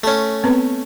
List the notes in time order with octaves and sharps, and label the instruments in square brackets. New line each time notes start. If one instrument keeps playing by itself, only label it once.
[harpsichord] A3 C#4
[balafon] B3 C4 B4